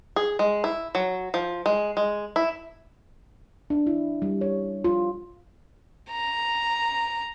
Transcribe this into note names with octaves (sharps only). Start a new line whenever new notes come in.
G#4
G#3
E4
F#3
F3
G#3
G#3
E4
D4
E4
G3
C#5
F4
A#5